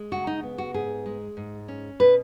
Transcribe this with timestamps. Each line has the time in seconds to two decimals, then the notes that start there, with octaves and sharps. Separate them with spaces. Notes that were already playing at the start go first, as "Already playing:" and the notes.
Already playing: G#3
0.12 C#3 F#4
0.27 D#4
0.43 B3
0.58 F#4
0.74 G#2 G#4
1.06 G#3
1.37 G#2
1.68 C#4
2.00 B2 B4